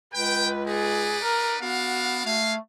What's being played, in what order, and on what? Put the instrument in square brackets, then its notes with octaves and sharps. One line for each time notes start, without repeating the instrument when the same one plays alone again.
[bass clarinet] C#2 [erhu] B4 [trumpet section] G5
[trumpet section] D#4 B4 D5 [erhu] G#4
[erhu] A#4
[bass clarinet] B3 [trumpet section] D4 F5 [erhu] F#4
[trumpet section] G#3 F5 [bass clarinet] A3